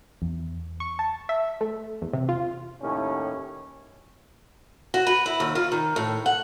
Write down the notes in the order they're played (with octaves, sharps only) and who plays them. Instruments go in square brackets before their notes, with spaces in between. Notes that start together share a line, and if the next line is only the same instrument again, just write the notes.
[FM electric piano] E2
[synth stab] C#6
A5
E5
A3
E2
C3
F4
[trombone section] D#2 A2 C#4
[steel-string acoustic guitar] F#4
B4
E4
D#2
F4
D#3
A2
F#5